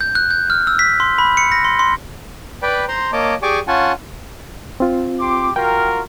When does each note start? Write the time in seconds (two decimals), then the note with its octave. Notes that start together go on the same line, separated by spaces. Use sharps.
0.01 G6
0.15 F#6
0.31 G6
0.50 F6
0.67 E6
0.79 B6
1.00 C6
1.18 B5
1.37 C#7
1.52 A#6
1.64 C6
1.79 C6
2.62 B4 D5 G5 B5
2.88 C5 A#5 C6
3.13 A#3 C#5 D#5 A5 D6
3.42 G4 G#4 D5 G#5 C#6 D6
3.68 C#4 F4 F#5 G#5 A5
4.80 C4 F4
5.20 G4 C6 D6
5.56 F4 F#4 A#4 G5